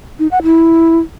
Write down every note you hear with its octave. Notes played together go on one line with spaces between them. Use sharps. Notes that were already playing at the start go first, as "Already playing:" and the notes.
D#4
F#5
E4